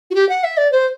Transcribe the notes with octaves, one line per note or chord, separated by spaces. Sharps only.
F#4
G4
F#5
E5
D5
C5